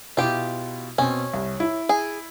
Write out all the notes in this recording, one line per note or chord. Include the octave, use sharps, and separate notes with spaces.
B2 E4 F4 G4
B2 C4 C#4
C2
E4
G#4